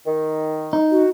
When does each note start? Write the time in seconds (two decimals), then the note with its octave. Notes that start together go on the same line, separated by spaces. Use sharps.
0.06 D#3
0.73 D#4
0.91 F#4